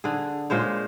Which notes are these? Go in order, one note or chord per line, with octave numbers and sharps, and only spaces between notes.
D3 G#4
A#2 G#3 C5 C#5